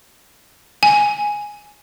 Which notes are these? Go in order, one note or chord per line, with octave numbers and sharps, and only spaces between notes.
G#5